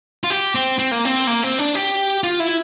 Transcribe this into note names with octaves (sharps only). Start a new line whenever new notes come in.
F4
G4
C4
C4
A#3
C4
A#3
C4
D4
G4
F4
E4